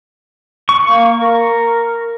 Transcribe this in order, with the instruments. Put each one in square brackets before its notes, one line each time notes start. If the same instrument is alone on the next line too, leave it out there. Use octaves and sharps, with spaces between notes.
[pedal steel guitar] C#6
[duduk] A#3
A#4